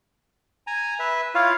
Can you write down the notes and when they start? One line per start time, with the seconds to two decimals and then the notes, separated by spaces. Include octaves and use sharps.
0.67 G#5 A#5
0.99 B4 E5
1.35 E4 F4 C#5 F5